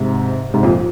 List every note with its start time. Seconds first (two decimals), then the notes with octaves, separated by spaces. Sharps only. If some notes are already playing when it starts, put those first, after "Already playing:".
Already playing: G#2 C3
0.54 G#2 C3
0.63 F2 A#2